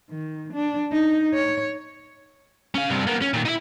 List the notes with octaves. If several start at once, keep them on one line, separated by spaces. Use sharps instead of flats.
D#3
D4
D#4
C#5
C#4 F5
G2 C3
A#3 B3
C#4
A#2 D#3
D#4 E4